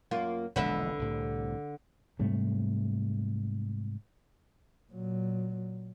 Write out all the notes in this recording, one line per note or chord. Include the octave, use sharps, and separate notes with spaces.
F#2 A#3 F4
E1 A#1 D3 G#3 B4 E5
C2 A2 C3
G#2 C3 G3 A3
A#2 F#3